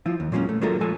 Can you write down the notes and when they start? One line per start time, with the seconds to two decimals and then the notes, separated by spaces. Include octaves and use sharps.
0.06 F3 E4 F4
0.20 D#2
0.32 A#2 F#3 G#3 A#3 C#4
0.49 A3
0.61 F#3 G#3 A#3 F4 A4 A#4
0.81 F3 G#3 A4 G#5 A5